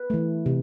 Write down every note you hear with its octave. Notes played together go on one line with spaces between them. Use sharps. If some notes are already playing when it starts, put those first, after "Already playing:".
Already playing: B4
E3 A3
C3